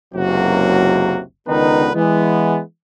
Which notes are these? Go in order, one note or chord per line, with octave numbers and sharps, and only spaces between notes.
F#1 C#2 C3 F#3 A#3 F#4
C#2 D3 D#3 B3 D#4 B4
E3 G#3 B3